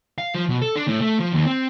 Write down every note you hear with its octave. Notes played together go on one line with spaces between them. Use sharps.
F5
F3
B2
A4
D4
A2
A3
F3
D#2
C4